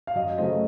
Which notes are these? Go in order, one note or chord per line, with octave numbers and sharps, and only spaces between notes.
F5
F#2 D#5
C#3 F#3 A3 C4 D#5